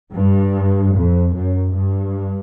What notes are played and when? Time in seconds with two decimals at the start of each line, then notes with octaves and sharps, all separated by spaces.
0.13 G2
0.95 F2
1.35 F#2
1.76 G2